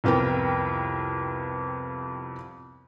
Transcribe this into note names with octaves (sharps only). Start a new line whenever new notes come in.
C2 F2 B3 A#4 G5